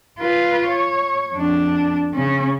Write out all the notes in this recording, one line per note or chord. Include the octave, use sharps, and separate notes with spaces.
F4 B4
C#5
F2 D4
C#3 C#4